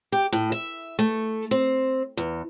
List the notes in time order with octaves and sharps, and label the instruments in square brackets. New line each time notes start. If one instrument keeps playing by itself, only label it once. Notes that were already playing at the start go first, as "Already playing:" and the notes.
[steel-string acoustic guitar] G4
A2
E5
A3
C4
E2